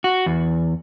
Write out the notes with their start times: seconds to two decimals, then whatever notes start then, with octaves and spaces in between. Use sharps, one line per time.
0.04 F#4
0.26 E2